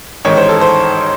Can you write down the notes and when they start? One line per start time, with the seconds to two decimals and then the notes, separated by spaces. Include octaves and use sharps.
0.25 A1 G#2 D#3 C#5
0.37 C5
0.49 A4
0.61 C5